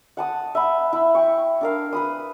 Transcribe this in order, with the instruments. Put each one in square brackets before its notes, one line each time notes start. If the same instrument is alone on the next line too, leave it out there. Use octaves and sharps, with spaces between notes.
[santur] F#5 A5 D#6
E5 F#5 B5
E4
G5 C#6
D4 A#4 F5
B4 B5 D#6